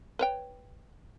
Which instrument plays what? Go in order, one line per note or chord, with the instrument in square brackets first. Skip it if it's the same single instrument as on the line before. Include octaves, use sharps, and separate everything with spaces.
[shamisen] B4 C#5 G5